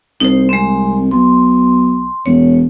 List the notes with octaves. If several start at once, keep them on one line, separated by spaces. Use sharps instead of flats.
C2 D#4 C5
G#3 C4
B1 C6
E1 C#5